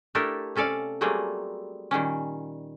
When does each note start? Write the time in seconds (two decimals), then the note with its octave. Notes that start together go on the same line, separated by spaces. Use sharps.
0.15 A3 D4 E4 G4 A4 A#4
0.56 C3 C#4 A4 D5 F5
1.01 F#3 G3 A3 A#3 C4 G#4
1.91 A#2 D#3 G3 C#4